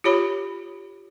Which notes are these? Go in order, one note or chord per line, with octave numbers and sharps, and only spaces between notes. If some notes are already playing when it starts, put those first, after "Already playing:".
F4 G4 C#5 B5